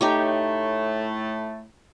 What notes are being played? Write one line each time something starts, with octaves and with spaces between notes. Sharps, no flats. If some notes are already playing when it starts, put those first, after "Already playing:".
A2 A3 D#4 G4 C#5